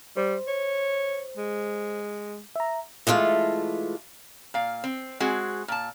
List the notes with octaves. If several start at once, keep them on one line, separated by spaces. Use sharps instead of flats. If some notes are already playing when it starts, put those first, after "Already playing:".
G3 C5
C#5
G#3
E5 A#5
E3 G#3 A3 F4
A#2 F5
C4
G#3 C4 F#4 G#4
A#2 A5